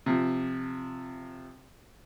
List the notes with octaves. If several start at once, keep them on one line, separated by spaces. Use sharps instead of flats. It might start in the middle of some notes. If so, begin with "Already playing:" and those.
C3 F3